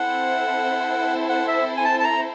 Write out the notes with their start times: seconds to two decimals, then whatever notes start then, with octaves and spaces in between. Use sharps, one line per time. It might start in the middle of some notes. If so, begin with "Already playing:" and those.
Already playing: C4 E4 A4 C5 F#5
1.29 F#5
1.48 E5
1.77 G#5
1.85 A5
2.00 A5
2.04 A#5